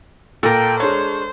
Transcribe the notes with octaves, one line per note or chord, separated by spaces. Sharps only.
A#2 A4 A#4 G5
G#3 D4 C5 C#5